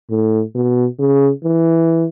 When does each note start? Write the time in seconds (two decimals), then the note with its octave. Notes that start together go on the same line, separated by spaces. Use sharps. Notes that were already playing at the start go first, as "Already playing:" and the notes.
0.11 A2
0.55 B2
0.99 C#3
1.44 E3